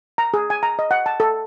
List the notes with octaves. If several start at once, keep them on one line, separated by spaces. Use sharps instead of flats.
A#5
G#4
G#5
A#5
D#5
F#5
A5
A4